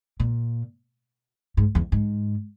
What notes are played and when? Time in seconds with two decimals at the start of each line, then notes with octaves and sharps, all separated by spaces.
0.20 A#2
1.57 G#2
1.75 E2
1.92 G#2